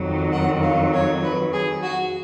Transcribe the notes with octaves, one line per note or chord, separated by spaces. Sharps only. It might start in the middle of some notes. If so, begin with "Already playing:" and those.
Already playing: F2 D#3 F#3
F#5
F5
C#5
B4
G#4
F#4